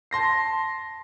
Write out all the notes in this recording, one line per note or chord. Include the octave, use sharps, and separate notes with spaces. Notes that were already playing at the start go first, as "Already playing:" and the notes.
A5 C6 A#6 C7